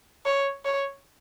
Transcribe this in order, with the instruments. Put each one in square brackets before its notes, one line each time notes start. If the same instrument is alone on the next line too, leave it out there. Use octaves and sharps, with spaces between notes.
[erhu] C#5
C#5